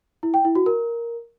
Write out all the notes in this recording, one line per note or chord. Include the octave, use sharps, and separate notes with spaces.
E4
G5
E4
F#4
A#4